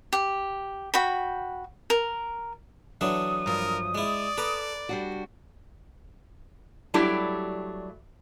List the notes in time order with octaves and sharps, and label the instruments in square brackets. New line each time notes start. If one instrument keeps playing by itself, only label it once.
[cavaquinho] G4
F#4 G5 B5
A#4
[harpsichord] E3 F#3 D4 [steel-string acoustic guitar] A4 [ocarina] D#6
[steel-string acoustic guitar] G2 F3 [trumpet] A#4
[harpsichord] G#3 E4 [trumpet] D5
[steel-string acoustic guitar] A4 [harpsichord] B4 A#5 D6
[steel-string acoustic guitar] G3 D4 F#4
[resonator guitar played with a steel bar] F#3 G3 A3 D4 E4 G4